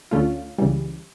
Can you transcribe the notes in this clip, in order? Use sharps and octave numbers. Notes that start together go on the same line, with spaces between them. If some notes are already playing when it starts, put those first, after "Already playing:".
D2 D3 A3 C#4 F4
C#2 C#3 E3 G3